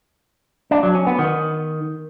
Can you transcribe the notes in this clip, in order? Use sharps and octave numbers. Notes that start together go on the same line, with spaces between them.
D4
F#3
C#4
B3
D#3